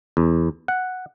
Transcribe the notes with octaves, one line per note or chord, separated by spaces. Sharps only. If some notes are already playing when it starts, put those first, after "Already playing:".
E2
F#5